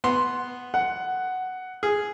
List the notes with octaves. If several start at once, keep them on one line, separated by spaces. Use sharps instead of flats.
B3 C6
F#5
G#4